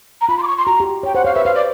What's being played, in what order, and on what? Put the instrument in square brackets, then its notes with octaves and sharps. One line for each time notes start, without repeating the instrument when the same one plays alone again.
[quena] A#5
[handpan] F4 [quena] B5
[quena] C6
D6
C#6
C6
[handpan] F#4 [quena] A#5
[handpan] G4
[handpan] C#5 [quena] G5
[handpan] C5 [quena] F#5
[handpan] C#5 [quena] F5
[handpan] B4 [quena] E5
[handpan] C5 [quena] F5
[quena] D5